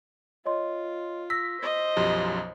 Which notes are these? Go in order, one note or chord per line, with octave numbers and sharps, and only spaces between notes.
F4 C#5 D#5 C6
E6 A#6 B6
C5 D#5
B1 F#2 F3 G4